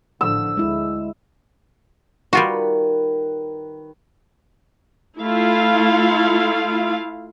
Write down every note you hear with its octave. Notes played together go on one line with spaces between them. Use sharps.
A1 D3 F3 E6
D2 G#3 E4
D#3 G3 F4 F#4 B4 B5
A3 E4 F4 F5